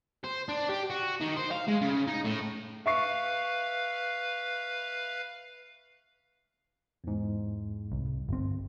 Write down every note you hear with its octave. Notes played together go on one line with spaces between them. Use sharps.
C5
D4
G4
F#4
D#3
C5
F5
G#3
C#3
D#4
A2
B4 E5 F5 C#6 C7
E2 G#2
C2
G1 C4